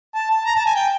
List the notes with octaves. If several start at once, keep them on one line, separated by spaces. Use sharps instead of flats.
A5
A5
A#5
A5
G#5
G5